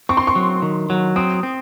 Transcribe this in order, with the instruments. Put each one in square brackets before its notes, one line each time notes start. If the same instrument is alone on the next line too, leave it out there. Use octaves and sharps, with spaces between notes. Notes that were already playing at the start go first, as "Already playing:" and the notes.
[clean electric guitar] C4 [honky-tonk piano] C#6
[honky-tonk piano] C6
C#6
[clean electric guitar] F#3
D#3
F#3
[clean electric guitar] C4 [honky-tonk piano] D#6
[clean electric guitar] C4